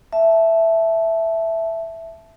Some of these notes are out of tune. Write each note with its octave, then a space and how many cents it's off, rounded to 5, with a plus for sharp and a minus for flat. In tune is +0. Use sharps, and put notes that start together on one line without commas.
E5 +0 A5 -15